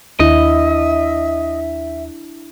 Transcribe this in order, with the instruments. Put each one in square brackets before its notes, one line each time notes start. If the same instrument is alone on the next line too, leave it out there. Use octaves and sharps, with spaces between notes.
[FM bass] D#2 [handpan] D4 E4 [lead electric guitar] D#5 [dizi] E5